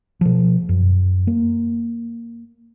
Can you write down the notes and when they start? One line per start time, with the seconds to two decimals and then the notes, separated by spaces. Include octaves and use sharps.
0.21 B2 F3
0.69 F#2
1.27 A#3